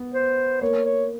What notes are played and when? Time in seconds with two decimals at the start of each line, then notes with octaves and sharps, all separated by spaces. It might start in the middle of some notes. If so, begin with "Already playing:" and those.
Already playing: B3
0.15 C5
0.62 A#3 C#5
0.85 C#5